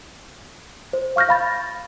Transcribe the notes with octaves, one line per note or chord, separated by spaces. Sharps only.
C5
F5 C#6 F6 G6 A#6
F5 B5 A6